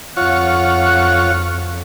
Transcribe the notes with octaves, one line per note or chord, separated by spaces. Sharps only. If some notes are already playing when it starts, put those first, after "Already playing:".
F2 F4 C#5 F#5